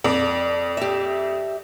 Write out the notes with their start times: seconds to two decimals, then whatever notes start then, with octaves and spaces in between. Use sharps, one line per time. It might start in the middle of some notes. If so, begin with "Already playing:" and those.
0.04 F2 D5
0.77 G4 E5